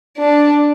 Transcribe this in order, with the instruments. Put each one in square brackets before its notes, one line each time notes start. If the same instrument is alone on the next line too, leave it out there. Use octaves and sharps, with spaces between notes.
[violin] D4